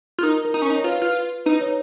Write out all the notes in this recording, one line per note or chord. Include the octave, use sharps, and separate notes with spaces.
F4
D#4 A#4
A#4
D#4
C#4 A#4
D#4
C#5
F4 B4
F4
D#4 B4
C#5